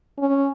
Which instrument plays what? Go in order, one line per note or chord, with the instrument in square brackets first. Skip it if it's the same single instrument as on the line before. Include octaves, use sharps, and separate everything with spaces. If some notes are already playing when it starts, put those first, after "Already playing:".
[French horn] C#4